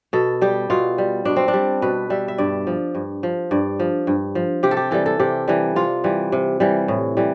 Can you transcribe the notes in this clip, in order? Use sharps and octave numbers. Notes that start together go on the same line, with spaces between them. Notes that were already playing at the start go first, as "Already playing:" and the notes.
B2 A4
G3 G4
B2 F4
G3
B2 D4
C4
D4
G3
B2 B4
G3 E5
E5
G2 D5
F3
G2
F3
G2 D5
F3
G2
F3
C3 G4
A4
G4
E3 G3 A4
A4
C3 G4
E3 G3
C3 F4
E3 G3
C3
E3 G3
A2
E3 G3